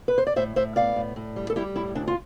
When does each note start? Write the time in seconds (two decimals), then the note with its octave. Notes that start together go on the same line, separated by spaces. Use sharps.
0.08 B4
0.18 C5
0.27 D5
0.36 A2 C5 E5
0.56 A2 C5 E5
0.76 B3 D5 F5
0.96 A2
1.16 A2
1.36 G3
1.50 A4
1.56 G3 E4 G4
1.76 A2 E4
1.95 D2 D4
2.08 F4